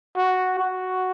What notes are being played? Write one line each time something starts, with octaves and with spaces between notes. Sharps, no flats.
F#4
F#4